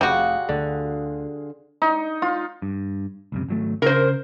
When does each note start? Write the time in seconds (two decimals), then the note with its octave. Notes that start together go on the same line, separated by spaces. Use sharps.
0.01 F1 G3 F4 F#4 G#4
0.49 D2 D3
1.82 D#4
2.22 F4
2.62 G2
3.32 C#2 F#2 C3
3.48 G#1 F#3 A3
3.82 C#3 A#4 C5